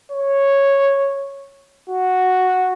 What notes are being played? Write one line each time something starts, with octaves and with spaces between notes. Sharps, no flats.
C#5
F#4